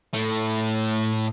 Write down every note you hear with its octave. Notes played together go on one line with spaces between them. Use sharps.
A2 A3